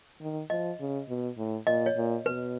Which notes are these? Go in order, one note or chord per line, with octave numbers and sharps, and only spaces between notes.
D#3
F3 D#5
C#3
B2
A2
A#2 D#5
C#5
A#2
B2 B4